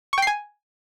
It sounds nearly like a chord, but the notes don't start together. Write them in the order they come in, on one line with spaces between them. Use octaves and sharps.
C#6 G5 C7 G#5